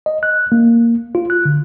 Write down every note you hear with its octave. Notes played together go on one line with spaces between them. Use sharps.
D#5
F#6
A#3
F4
F#6
D3